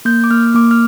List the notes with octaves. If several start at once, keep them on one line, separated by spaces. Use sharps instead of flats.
A#3 G6
D6
A#3 F6
A#3 D6
F6